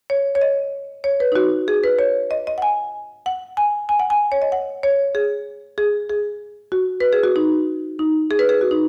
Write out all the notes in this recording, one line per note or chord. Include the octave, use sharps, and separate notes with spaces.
C#5
C#5
D#5
C#5
B4
D#4
F#4
G#4
B4
C#5
D#5
D#5
F#5
G#5
F#5
G#5
G#5
F#5
G#5
C#5
D#5
F#5
C#5
G#4
G#4
G#4
F#4
B4
G#4
F#4
D#4
D#4
G#4
B4
G#4
F#4
D#4